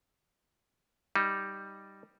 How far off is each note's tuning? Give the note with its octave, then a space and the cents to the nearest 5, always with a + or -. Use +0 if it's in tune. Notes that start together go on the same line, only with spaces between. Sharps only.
G3 +0 D#4 +0